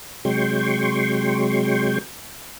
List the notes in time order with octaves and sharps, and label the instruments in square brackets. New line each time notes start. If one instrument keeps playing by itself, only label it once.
[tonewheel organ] C3 F#3 G#3 G5 C6 C#6